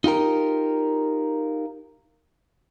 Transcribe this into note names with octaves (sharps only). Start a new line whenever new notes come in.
D#4 F4 G4 A#4